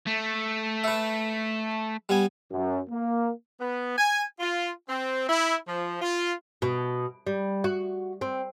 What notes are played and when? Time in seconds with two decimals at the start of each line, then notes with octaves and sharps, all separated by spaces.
0.07 A3
0.84 B4 E5
2.09 G3 B3 G#5
2.52 F#2
2.90 A#3
3.60 B3
3.98 G#5
4.40 F4
4.89 C4
5.29 E4
5.67 F3
6.00 F4
6.62 B2
7.27 G3
7.64 F#4
8.21 C4